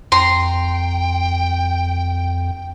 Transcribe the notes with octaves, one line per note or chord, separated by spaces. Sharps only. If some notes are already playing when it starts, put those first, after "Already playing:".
F2 G5 A#5 C6